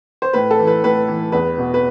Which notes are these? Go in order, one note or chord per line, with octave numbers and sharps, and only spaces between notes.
C5
A2 B4
A4
E3
B4
A2 B4
E3
E2 B4
B2
B4